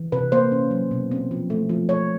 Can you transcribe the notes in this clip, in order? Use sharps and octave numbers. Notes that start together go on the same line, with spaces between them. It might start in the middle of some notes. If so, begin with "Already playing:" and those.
Already playing: E3
C3 B4
A#3 C5
C#4
F#3
B2
C4
F3
A3
F3
A3 C#5